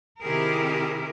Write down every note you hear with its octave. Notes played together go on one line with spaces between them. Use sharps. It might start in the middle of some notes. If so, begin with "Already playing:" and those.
C3 D#3 E4 G4 G#4 A#4